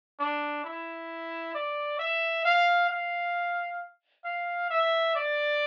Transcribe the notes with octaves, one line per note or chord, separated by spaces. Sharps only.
D4
E4
D5
E5
F5
F5
F5
E5
D5